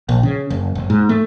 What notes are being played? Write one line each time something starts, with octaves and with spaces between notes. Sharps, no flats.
A#1
C#3
F#1
F#1
G#2
A3